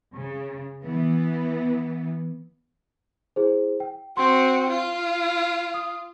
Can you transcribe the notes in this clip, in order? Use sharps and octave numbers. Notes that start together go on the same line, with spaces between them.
C#3
E3 B3
E4 G#4 C5
G5
C4 F#4 C6
F4
D#6